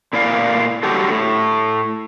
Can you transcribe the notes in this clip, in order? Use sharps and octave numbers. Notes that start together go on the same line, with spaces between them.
A#2 E4 D5 F5
D3 F#3 G3 F#4 G4 A4
A2